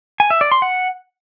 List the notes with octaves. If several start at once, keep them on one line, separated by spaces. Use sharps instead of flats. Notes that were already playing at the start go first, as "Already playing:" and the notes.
G#5
E5
D5
C6
F#5